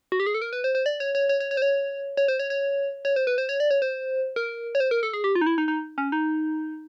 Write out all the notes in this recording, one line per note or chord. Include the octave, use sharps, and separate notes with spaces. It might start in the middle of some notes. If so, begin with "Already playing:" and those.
F#4
G4
G#4
A4
A#4
B4
C5
C5
D5
C#5
C#5
C#5
C#5
C#5
C5
C#5
C#5
C5
C#5
C#5
C#5
C5
B4
C5
C#5
D5
C#5
C5
A#4
C#5
C5
A#4
A4
G#4
G4
F4
D#4
E4
D#4
D#4
C#4
D#4